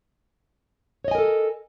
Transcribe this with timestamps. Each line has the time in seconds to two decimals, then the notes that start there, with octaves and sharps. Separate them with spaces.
1.04 C#5
1.08 D#5
1.11 G#5
1.15 A#4
1.18 A4